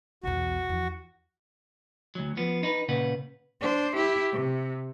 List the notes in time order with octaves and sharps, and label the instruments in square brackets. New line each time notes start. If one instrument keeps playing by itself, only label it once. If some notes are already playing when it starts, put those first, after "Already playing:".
[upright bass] B1 E2 [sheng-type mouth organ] F#4
[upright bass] E2 F3
[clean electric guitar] D2 F#3
F3 B3
D#4 B4
A#2 C#3 B4 F#5
[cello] D4 C5
E4 G4
C3